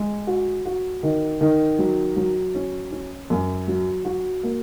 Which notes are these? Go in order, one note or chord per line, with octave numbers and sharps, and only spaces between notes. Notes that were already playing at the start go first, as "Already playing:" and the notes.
Already playing: G#3
F#4
F#4
D#3
D#3
F#3
F#3
C#4
C#4
F#2
F#3
F#4
A#3